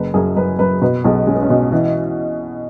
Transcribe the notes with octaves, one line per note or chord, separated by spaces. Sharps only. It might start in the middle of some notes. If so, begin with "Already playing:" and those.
Already playing: F#1 B4
F#2 G#4
F#2 B4
F#2 B4
B2 B4
B1 G#4
G#3 C#4
B3
C#4
B2
E3